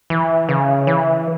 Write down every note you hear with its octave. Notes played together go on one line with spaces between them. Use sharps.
E3
C#3
E3